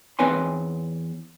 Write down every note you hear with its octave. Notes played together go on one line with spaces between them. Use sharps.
E2 C4 B4 C#5 G#5 C6